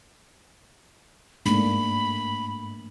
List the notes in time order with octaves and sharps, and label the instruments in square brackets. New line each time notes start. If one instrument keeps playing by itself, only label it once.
[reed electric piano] G#2 [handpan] A3 A#3 D4 [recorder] B5